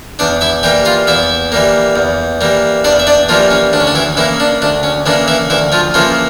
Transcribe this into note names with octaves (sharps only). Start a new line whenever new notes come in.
E2 D4 D5
E4 E5
E3 G3 A#3 G4 G5
F4 F5
E2 E4 E5
E3 G3 A#3
E2
E3 G3 A#3
E2 D4 D5
E5
D4 D5
E3 F3 G3 A#3 F4
C#4
D2 D4
C#4
D4
E3 E4
C#3 E3 A#3 E4
D4
D2 D4
C#4
C#3 E3 A#3 D4
E3 E4
D2 E3 E4
F3 F4
C#3 E3 F3 A#3 F4